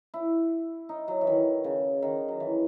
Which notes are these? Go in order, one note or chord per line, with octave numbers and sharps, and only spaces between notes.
E4
D#4
F#3
E3
D#3
C#3
D#3
F#3
E3